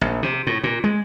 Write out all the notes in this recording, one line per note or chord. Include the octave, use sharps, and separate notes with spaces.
A#1
C3
A2
A#2
G#3